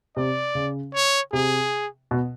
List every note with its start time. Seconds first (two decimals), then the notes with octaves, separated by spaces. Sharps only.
0.16 C3 D5
0.55 C#3
0.94 C#5
1.33 C3 G#4
2.11 B2